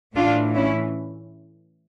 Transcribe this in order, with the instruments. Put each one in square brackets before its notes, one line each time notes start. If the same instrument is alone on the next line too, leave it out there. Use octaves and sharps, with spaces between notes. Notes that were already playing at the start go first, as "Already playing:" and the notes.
[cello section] A2 E3 D4 F4
C#4 E4